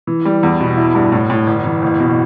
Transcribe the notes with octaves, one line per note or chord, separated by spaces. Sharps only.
E3
G3
E2
B2
E4
G2
A2
A2
G1
E3
F#1
B2